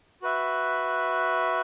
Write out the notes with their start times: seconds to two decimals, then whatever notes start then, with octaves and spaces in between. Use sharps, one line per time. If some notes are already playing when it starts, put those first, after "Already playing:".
0.22 F#4 B4 E5